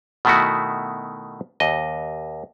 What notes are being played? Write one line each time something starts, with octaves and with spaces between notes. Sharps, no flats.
B2 D#3 A3 E4 F#4
D#2 D#5